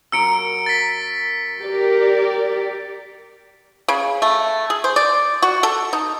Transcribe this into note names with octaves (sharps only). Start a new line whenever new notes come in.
F#2 A#5 E6 C#7 D7
A6 B6
G4 A#4 D5
C#3
A3
G#4
C5
D5
F#4
A4
D#4